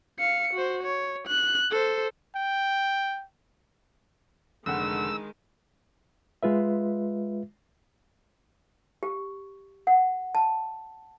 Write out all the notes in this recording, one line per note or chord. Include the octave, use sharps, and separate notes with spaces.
F5 C#7
F#4 C5
C#5
F#6
A4 C5
G5
F1 D3 D#3 G#3 F#5 E6
G#3 F4 B4 E5
G4
F#5
A5